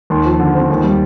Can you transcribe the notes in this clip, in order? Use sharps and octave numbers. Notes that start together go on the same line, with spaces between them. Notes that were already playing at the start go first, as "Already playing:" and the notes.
D#2 C6
F3
D3
C4
D#2
G3